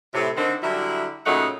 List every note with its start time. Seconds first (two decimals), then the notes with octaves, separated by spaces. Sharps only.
0.14 A2 C3
0.36 D3 D#3 C4
0.62 D3 F#3 G3 E4
1.26 A#2 C#3 F#3 A3 D#4 F#5